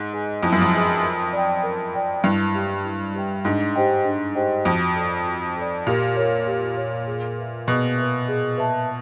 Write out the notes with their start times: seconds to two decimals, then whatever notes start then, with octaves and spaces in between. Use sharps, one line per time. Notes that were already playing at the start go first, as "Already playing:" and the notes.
Already playing: G#2
0.13 G#4 B4 D#5 G#5
0.42 F2 E4
0.52 F#2
0.62 F2
0.73 G#4 B4 D#5 G#5
1.03 A#4
1.33 D5 G5
1.63 A#4
1.94 D5 G5
2.24 G2 E4
2.54 G4 B4 E5 G5
2.84 E4
3.14 G4 B4 E5 G5
3.45 G#2 D4
3.75 G4 C5 D#5 G5
4.05 D4
4.35 G4 C5 D#5 G5
4.65 F2 F#4
4.96 A4 D5
5.26 F#4
5.56 A4 D5
5.87 A#2 G4
6.17 A#4 C#5
6.47 G4
6.77 A#4 C#5
7.07 G#4
7.38 B4 E5
7.67 B2 G#4
7.98 B4 E5
8.28 G#4
8.58 B4 E5 A5